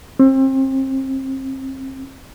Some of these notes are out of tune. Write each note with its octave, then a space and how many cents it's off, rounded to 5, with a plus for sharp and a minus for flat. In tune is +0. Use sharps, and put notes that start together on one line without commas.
C4 +30